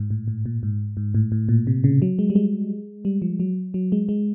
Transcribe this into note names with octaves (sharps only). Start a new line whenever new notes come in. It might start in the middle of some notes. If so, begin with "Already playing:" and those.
Already playing: G#2
A2
A2
A#2
G#2
G#2
A2
A2
A#2
C3
C#3
F#3
G#3
G3
G#3
G3
F3
F#3
F#3
G#3
G#3